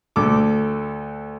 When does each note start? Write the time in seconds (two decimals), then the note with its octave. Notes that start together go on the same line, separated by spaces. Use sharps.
0.16 D2 A4 D6